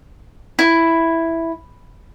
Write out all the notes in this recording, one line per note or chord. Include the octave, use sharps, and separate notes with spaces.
E4